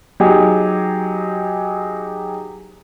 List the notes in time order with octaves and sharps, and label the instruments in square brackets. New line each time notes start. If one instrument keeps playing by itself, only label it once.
[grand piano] F#3 D#4 G4 G#4